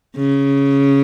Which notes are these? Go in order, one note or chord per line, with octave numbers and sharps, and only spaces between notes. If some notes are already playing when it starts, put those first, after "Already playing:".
C#3